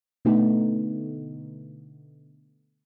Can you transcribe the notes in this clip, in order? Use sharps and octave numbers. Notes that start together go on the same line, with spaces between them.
B2 D3 A3 B3 D#4